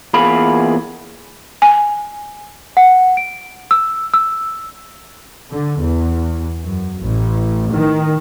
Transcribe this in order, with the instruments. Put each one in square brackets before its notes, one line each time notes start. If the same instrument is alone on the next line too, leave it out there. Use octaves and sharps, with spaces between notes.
[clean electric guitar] E2 A#2 G#4 F5 B5
[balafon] G#5
[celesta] F#5
D7
E6
E6
[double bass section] D3
E2
F#2
A1
D#3